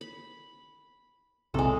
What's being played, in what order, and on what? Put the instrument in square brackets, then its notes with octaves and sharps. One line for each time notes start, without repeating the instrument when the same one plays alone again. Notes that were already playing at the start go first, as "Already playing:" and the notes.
[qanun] B5
[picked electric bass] B1 C3 [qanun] G#3 A4